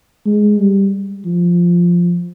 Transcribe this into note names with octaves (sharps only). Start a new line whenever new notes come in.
G#3
G3
F3